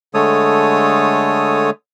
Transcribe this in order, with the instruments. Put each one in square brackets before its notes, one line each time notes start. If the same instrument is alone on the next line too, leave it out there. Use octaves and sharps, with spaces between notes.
[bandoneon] D3 G#3 A3 A4 C#5 D#6